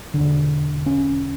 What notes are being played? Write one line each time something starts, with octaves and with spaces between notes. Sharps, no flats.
E1 D#2 D3 D4
C#4